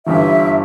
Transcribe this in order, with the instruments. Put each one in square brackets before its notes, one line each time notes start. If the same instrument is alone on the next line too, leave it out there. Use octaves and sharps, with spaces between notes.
[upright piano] G1 G2 E3 [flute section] E5